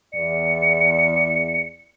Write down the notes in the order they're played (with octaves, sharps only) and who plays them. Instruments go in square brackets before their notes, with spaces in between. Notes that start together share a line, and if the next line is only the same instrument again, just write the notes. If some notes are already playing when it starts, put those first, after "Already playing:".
[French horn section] E2 D5 [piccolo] C#7